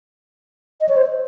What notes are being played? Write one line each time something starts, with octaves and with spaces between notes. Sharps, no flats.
D#5
C#5
C5